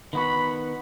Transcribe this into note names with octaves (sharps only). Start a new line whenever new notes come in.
D#3 B3 F#4 B5